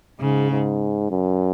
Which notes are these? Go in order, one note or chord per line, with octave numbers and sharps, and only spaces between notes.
G#2 C#3
G#2
F#2